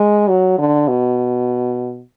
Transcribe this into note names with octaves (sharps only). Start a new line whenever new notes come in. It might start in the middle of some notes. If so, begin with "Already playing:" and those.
Already playing: G#3
F#3
D3
B2